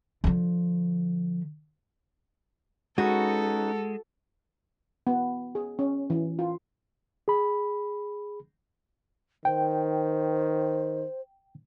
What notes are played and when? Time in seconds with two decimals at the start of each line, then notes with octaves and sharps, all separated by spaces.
0.24 D3 F3
2.98 G#3 C#4 D#4 F#4 A4 B4
5.07 B3
5.55 G#4
5.79 C#4
6.10 E3
6.39 F4
7.28 G#4 B5
9.45 D#3 C5 G5